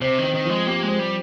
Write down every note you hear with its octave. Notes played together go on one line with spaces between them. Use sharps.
C3 C5
D#3 C4
D#3
F3 G#3
A#3 G4
G#3
C5
G3